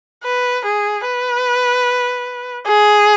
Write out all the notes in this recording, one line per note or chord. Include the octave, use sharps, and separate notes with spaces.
B4
G#4
B4
G#4